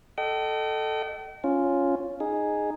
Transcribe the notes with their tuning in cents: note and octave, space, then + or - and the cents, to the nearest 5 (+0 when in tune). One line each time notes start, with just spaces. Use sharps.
A4 +0 D#5 -15 G5 -40
C#4 +0 F4 +0
D#4 -10 G#4 +0